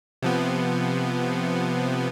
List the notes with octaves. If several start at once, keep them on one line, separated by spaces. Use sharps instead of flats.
C3 F3 B3